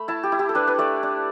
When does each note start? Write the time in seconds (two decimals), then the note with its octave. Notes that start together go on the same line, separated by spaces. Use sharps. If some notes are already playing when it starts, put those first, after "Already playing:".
Already playing: A3 B5
0.08 E4 A5
0.23 G4
0.32 E4
0.39 G4
0.49 A4
0.55 D4 B4
0.67 B4
0.78 A3 D5
1.03 D4